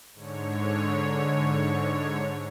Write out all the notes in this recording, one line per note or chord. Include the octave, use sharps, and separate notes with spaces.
G#2 D3 C#5